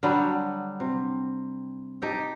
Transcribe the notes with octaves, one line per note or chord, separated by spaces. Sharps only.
D3 F#3 G3
C3
D#4 G4 A4